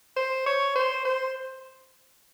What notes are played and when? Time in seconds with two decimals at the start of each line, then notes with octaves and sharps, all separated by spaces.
0.16 C5
0.46 C#5
0.76 C5
1.05 C5